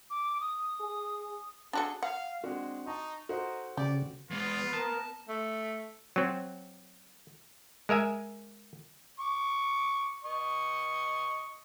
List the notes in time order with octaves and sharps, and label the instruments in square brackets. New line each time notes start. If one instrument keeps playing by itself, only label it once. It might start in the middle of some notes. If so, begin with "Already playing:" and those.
[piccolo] D6
D#6
[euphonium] G#4
[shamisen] D4 F#4 A4 [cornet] G#4
[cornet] F5 [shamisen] F#5
[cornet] G#3 [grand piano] C4 D4 F#4
[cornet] D#4 [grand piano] A5 C#6
[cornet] D#4 [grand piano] F#4 A4 C5
[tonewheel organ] C#3 [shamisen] G4 [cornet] D5
[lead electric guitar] E3 G#3 [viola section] B3 [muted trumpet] F4
[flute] A#4 [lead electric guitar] A5
[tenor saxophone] A3
[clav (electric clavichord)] F#3 C4
G#3 A#4 E5 G#5
[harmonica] C#6 D6
D#5 C#6